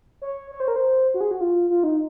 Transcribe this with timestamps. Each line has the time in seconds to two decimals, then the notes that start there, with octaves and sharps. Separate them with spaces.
0.22 C#5
0.51 C#5
0.60 C5
0.68 A#4
0.76 C5
1.14 F#4
1.21 G#4
1.31 F#4
1.41 F4
1.70 F4
1.84 D#4